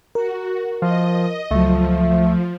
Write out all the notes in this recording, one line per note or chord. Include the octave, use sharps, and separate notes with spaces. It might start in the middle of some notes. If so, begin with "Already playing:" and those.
F#4 A#4
F3 D#5
C#2 F3 F#3 A3